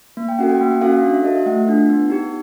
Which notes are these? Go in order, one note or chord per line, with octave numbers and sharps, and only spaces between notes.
A#3
G5
C#4 F#4 A4 F#5
G5
A#3
F#5
C#4 F#4 A4 F5
F5
D4 F5
E5
F#4 A4 D#5
E5
A3 F#5
D4 F4
B3
D#4 G4